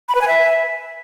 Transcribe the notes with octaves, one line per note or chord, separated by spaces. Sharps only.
B5
B4
G#5
E5